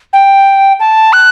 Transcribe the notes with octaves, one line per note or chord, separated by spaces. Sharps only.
G5
A5
F#6